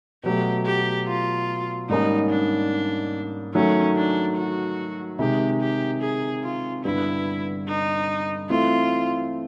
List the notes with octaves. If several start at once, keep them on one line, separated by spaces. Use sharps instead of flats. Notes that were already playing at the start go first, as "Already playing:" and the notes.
B2 F#3 A3 G4
G4
F4
G#2 D#3 G3 A#3 C#4 D#4
D4
D#3 F#3 A3 C#4
D4
F#4
C3 D#3 G#3 G4
G4
G#4
F4
G2 D3 G3 B3 E4
D#4
E3 A3 C4 E4 F4